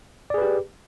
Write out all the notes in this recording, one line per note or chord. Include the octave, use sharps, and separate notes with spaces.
G4 G#4 B4 D5